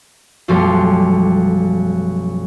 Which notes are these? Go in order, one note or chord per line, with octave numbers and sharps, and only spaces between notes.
B1 F#2 F3 G3 A3 C6